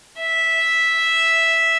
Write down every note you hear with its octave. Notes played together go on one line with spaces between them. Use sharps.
E5